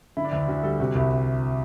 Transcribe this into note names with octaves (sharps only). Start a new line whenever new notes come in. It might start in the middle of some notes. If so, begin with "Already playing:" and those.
D3 E4
D4
D2 E4
D2 F#4
G3 A4
C3 F#4
C2 E4
E4